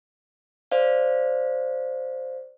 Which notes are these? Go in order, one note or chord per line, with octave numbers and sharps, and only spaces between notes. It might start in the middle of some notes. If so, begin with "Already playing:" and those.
C5 D5 F5